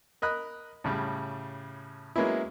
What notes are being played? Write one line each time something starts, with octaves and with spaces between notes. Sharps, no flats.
A#4 D#5 B5 F#6
A2 C#3 G3
F#3 G#3 A#3 B3 C#4 E4